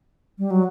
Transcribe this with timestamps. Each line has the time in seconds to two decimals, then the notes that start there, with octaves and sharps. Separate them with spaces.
0.38 G3
0.51 F#3